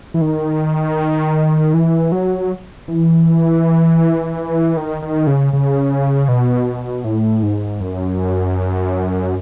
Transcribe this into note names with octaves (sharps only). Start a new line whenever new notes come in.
E3
D#3
E3
F#3
E3
D#3
D#3
C#3
C#3
B2
A2
G#2
F#2